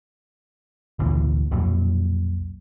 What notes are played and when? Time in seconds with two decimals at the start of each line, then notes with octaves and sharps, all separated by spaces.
0.99 G#1 D2 A#2 E3
1.51 B1 F2 A#2 F#3